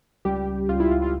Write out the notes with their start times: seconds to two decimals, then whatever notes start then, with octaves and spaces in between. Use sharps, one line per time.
0.25 C#2 G3 G4
0.47 C#2
0.69 C#2 F4
0.80 E4
0.91 C#2 F4
1.02 F4